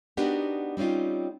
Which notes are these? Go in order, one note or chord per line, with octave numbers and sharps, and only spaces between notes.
B3 D4 D#4 F#4 G4 A#4
G3 C4 C#4 D#4 F4